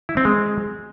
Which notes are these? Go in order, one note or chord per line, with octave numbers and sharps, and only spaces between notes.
E4
C4
G#3